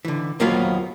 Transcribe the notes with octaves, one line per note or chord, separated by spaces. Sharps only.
D3 E3
D#2 F#3 A#3 B3 F4 C5